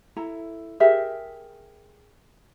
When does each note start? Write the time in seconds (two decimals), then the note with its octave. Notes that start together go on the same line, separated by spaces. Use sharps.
0.16 E4 A4 A#5
0.80 G4 G#4 A#4 E5